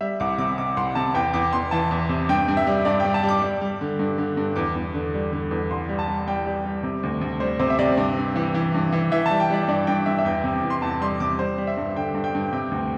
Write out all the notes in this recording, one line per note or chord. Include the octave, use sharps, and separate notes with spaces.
G3 E5
C2 D6
C3 D6
C3 D6
C2 C6
C3 A5
E2 G5
E2 D6
E2 C6
E3 A5
E2
C3
G2 G5
G2
E5
G3
G2 D5
G3 G5
A5
G3
D6
G3
G3
D3
G2
D3
G2
E2 D6
E2
D3
G3
D3
E2
C2 C6
G3
A5
G3
G3 G5
G3
G3
C3
D2
D2
G3 C5
C3 C5
E5
C3 D5
G2
G2
E3
E3
G2
E3
E3 E5
G3 A5
G5
G3 D5
G2 D5
G2 G5
G2 E5
E5
E2 G5
C3
E2
C6
E2 A5
G3 C6
C3 D6
G3 C5
G3
E5
G2
D3 G5
G2
G5
G2
C3 G5
D2